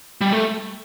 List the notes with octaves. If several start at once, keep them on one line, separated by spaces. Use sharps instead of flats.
G3
A3